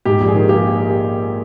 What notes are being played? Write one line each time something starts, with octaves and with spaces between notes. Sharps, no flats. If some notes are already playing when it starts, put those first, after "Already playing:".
G#2 G4
A#1
G#4
D#3
A#3 G4